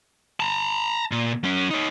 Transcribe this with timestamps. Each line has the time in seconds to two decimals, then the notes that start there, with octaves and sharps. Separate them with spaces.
0.40 A5 A#5
1.12 A#2
1.44 F#3 C#4
1.71 D#4 C#5